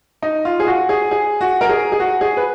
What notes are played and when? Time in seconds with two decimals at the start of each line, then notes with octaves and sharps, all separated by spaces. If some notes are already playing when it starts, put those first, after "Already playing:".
0.22 D#4
0.45 F4
0.60 G#4
0.67 F#4
0.89 G#4
1.11 G#4
1.41 F#4
1.61 A#4
1.69 G#4
1.92 G#4
2.00 F#4
2.21 G#4
2.37 B4